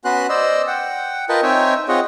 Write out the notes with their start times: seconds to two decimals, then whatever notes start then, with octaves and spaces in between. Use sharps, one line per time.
0.05 B3 C#4 F#4 B4 C6 F#6
0.29 C5 D5 D#5 E6
0.67 F#5 G5
1.29 F4 A#4 B4 D#5 G5 A5
1.43 C4 D#4 C#5 E5 G5 G#5
1.88 C4 F4 G#4 C#5 D#5 F#5